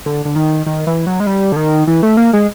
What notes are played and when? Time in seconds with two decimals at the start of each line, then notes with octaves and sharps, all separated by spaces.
0.06 D3
0.25 D3
0.36 D#3
0.66 D#3
0.87 E3
1.07 F#3
1.20 G#3
1.27 G3
1.52 D3
1.56 D#3
1.87 E3
2.03 A3
2.17 A#3
2.33 G#3